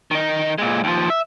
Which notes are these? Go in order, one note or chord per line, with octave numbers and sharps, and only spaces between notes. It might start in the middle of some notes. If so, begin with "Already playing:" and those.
D#3 D#4
A#2 G#3
D#2 F3
E5